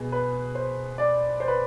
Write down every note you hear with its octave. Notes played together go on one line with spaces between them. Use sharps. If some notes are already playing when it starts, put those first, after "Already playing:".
Already playing: B2 B3 G#4
B4
C5
D5
C5
B4